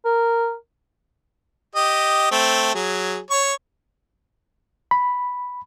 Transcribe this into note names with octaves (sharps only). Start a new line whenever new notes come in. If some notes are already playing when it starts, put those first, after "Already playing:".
A#4
G4 D#5
A3 C4
F#3 G#4
C#5 C#6
B5